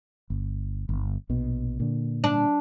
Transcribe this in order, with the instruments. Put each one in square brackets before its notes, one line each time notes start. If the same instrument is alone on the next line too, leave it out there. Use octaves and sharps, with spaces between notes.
[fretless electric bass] G1
G1
A#1 B2
A#2 D3
[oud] D4